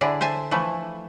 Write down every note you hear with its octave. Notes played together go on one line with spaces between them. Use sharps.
D3 D4 E4 G#4
C5 E5 G#5 A5
E3 F3 A3 E4